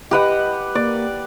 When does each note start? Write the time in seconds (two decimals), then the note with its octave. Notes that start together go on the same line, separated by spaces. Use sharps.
0.11 G4 B4 D#5 F#5
0.75 A#3 D5